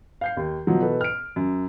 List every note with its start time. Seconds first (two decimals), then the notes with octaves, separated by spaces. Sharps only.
0.21 F5 G6 C7
0.37 D#2
0.67 B2 F3 F#3
0.80 B2 E3 A4 B4
1.01 F6 D7
1.36 F#2